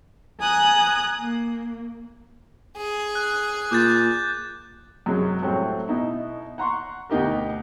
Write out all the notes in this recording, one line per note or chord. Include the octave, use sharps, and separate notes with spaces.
G#5 A#5 D#6 F#6
A#3
G#4
F#6
A#2 D6 G6 A6
F#2 C3 F#3 G#3
A2 F#3 G3 A3 C4
B2 D#4 E4
F#5 A#5 C6 C#6
D2 B2 D#4 G4 A#4